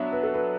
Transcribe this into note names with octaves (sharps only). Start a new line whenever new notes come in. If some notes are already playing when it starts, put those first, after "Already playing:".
Already playing: F#3 B3 D4 E5
B4
A4
B4